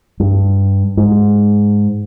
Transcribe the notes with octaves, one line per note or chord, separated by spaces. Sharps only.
G2
G#2